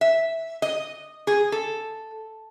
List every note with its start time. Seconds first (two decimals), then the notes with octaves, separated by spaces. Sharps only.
0.01 E5
0.62 D#5
1.27 G#4
1.52 A4